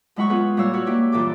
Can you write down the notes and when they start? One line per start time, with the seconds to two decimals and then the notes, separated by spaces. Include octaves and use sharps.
0.16 F#2 G#3 E4 F#5 B5 C#6
0.30 B3 F4 G#4 B4
0.57 A#2 G3 A#4 C#5 F5 E6
0.73 F#4 B4 C#5
0.86 A#3 E4 G4
1.12 G2 A#2 E3 A4 D6